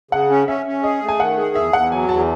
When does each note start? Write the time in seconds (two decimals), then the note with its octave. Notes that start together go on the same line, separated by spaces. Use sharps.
0.11 C#3 F#5
0.30 C#4
0.47 C#4 E5
0.66 C#4
0.83 G#4 D#5
1.02 A3
1.09 G#5
1.20 D#3 F#5
1.38 G#4
1.55 E2 E5
1.73 E2 F#5
1.91 F#3 G#5
2.09 E2 A5